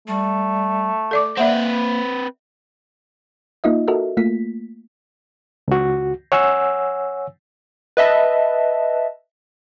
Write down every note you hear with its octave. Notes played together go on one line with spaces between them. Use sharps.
G3 A3
A4 D5 D6
A#3 C4 B4 D5 E5 F#5
A#3 D#4 F4 D#5 E5
F#4 A4 A#4 D#5 E5
A3 A#3 F4 B6
C#2 F#4
C#5 F#5 G#5 E6
B4 D#5 E5 A5